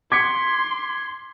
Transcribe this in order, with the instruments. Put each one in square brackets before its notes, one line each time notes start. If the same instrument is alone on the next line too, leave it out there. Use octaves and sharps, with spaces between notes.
[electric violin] C6 [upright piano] D6 B6 C#7 [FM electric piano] G#6